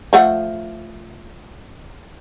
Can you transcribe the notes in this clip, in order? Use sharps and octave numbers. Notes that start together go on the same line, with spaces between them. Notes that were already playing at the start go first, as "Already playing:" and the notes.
F3 A3 F#5